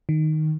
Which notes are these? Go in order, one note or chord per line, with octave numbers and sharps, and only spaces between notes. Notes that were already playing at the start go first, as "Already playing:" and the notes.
D#3